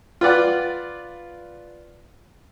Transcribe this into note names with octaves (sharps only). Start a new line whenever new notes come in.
F4 B4 D5 F#5